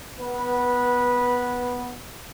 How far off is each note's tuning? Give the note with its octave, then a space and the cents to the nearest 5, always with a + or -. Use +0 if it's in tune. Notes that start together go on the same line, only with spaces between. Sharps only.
B3 +0 B4 -15